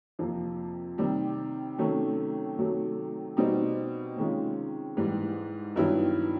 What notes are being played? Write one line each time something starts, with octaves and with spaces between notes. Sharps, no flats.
F2 C3 F3 A#3
C3 D#3 G3
C3 D#3 F#3 A3 C#4
C3 D#3 F#3 A3
B2 G3 C4 D#4
C3 D#3 G#3 C#4 F4
G#2 E3 G3
G2 D#3 F#3 B3 E4